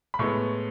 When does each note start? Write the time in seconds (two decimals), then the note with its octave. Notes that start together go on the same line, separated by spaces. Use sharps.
0.14 B5
0.19 A2 G#3 B3 C#6